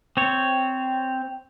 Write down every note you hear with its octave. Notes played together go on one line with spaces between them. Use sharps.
C4 C#5